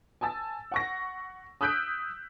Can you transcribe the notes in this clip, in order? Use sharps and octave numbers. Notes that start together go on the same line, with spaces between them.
G#5 A5 E6 A6
F#5 C#6 A#6
D#6 E6 F#6 G6 B6 D7